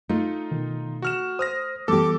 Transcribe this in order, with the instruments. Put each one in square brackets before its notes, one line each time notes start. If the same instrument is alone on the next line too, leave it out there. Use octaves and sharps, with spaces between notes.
[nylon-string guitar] A3 [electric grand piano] D#4 F4
[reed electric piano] B2 D#3
[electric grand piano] F#4 F6 E7
[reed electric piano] C5 [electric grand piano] D#6 F6 A#6
[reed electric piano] E3 G3 B3 [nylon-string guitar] A3 G4 [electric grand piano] A4 [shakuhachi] D6